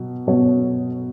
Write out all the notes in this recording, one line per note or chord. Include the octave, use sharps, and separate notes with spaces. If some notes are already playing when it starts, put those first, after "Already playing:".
Already playing: B2 F#3
B2 F#3 B3 F#4 C#5